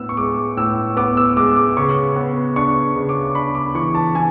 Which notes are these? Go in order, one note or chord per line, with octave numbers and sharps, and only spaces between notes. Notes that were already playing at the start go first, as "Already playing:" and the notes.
Already playing: A2 B3 E6
C#6
G#3 D6
A2 E6
B3 D6
E6
G#3 D6
D6
C#3 C#6
B3
D4 C#6
C#3
D6
D4 B5
D6
E3 C#6
A5
E3 G#5